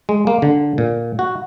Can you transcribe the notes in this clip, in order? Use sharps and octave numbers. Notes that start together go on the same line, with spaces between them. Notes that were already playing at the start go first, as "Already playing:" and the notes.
G#3
A#3
D3
A#2
F#4